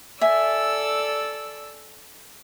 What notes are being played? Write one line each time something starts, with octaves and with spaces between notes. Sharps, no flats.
A4 D5 E5 G#5 E6